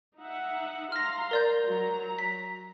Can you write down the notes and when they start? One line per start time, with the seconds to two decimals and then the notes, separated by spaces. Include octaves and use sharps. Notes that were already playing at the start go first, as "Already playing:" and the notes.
0.17 D#4 E5 F#5
0.92 F5 A#5 C6 F6 A#6
1.31 A#4 D5 G6
1.66 F#3 A#5
2.19 B6